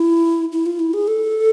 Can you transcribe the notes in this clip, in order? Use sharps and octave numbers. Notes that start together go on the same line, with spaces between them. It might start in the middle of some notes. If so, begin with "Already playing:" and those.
Already playing: E4
E4
F4
E4
G#4
A4